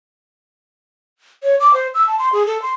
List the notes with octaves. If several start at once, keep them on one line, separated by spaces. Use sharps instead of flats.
C#5
D6
C5
E6
A5
C6
G#4
A4
C6